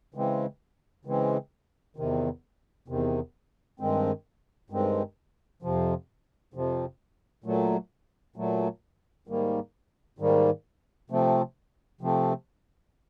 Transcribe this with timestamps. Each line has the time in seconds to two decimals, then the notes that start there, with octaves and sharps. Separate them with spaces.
0.14 C#3 E3 G#3 C4
1.05 C#3 E3 G#3 C4
1.96 E2 C3 D#3
2.88 E2 C3 D#3
3.80 G2 D#3 G#3 C4
4.70 G2 D#3 G#3 C4
5.62 F2 C3 F3
6.54 F2 C3 F3
7.44 A#2 F#3 A3
8.36 A#2 F#3 A3
9.27 G#2 D#3 G3 A#3
10.19 G#2 D#3 G3 A#3
11.10 C3 F3 A3 C4
12.01 C3 F3 A3 C4